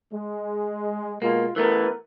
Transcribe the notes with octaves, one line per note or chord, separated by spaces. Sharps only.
G#3
B2 G#3 A#3 F4
E3 A3 B3 A#4